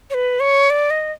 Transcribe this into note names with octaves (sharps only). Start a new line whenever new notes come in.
C#5
B4
C#5
D5
D#5